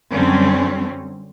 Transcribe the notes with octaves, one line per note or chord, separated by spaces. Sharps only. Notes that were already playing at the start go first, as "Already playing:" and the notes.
F#2 D3 F#3 G3 C4 C#4